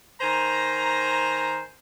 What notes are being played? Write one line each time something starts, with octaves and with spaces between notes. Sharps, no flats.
D#3 C5 G#5 A#5